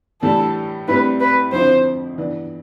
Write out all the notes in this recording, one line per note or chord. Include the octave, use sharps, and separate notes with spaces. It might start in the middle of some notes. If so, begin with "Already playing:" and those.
A2 E3 G3 D4 A4
A2 G3 C4 E4 B4
B4
F2 D3 F3 C4 E4 C5
G2 E3 B3 D4